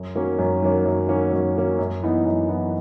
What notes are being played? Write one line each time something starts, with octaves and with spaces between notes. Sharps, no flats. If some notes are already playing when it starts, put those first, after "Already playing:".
Already playing: F#2
D#3 F#3 A#3 C#4
F#2
D#3 F#3 A#3 C#4
F#2
D#3 F#3 A#3 C#4
F#2
D#3 F#3 A#3 C#4
F#2
E3 B3 D#4
F#2
E3 B3 D#4